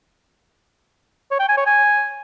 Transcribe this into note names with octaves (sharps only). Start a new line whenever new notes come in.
C#5
G5
G#5
C#5
G#5